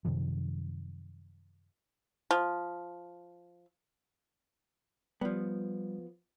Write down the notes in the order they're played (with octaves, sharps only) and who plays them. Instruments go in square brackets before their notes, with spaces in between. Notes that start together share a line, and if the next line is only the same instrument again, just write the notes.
[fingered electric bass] F#2 C3 D#3 F3
[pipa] F3
[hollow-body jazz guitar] F3 B3 [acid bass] G3